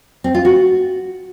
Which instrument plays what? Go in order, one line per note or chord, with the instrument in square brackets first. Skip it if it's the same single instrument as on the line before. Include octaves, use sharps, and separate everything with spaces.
[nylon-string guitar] C4
F4
F#4